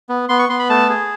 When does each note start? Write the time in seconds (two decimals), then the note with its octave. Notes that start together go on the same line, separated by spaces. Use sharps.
0.09 B3
0.29 B3 C6
0.39 C#6
0.49 B3 C6
0.59 B5
0.70 A3 A5
0.89 G#4